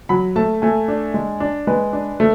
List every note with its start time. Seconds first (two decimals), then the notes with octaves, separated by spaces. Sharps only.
0.09 F#3 B5
0.36 A3 A5
0.62 A3 G#5
0.88 D4
1.14 G#3
1.40 D4
1.67 G#3 B4
1.93 D4
2.20 A3